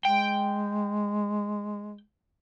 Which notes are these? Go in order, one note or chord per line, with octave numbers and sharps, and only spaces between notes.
G#3 G5